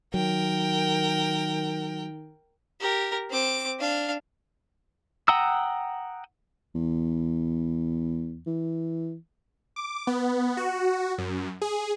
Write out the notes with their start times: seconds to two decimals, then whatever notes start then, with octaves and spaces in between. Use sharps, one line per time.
0.14 D#3 F#3 A#4 G5
2.81 G4 A#4
3.30 C4 D6
3.79 D4 F5
5.28 F#5 G5 A#5 D#6 E6
6.75 E2
8.47 E3
9.76 D6
10.07 B3
10.57 F#4
11.18 F#2
11.62 G#4